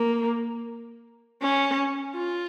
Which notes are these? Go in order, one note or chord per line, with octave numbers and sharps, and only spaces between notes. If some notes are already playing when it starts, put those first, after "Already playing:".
Already playing: A#3
C#4
F4